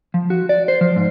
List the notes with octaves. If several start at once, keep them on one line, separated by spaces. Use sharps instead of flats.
F3
F#4
D5
C5
F3
G#2